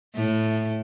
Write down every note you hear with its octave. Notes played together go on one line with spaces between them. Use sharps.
A2